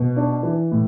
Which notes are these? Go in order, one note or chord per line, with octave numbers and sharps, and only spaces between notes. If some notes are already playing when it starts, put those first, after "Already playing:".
Already playing: B2
D4
E3
A2